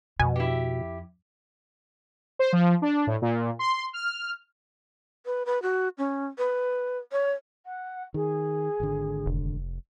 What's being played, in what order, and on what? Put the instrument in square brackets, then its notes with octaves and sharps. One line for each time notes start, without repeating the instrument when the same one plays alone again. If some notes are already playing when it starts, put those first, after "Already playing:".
[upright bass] F2 [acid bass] B2 [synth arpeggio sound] G#5
[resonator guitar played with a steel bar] E4 G4
[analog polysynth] C5
F3
D4
A2
A#2
C6
F6
[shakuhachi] B4
B4
F#4
C#4
B4
C#5
[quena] F#5
[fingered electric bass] D#3 [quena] G#4
[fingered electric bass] G#1 D3
[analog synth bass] F1